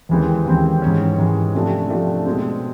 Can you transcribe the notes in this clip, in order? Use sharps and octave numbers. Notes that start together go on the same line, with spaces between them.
D#2 C#3 E3 G#3 C4
D#2 C#3 E3 G#3 C4
G#2 E3 G#3 C#4
G#2 E3 G#3 C#4
C3 F3 A3 D4
C3 F3 A3 D4
B2 G#3 C4